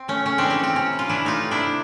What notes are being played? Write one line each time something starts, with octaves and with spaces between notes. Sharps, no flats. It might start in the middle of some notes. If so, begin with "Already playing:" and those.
Already playing: C4
A3 C#4
C#3 C#4
E3 C4 D4
C#4
E3 C4
C3 C#4
E3
F4
E3 D4 E4
A3 D#4 F4
C3
D4 E4
C3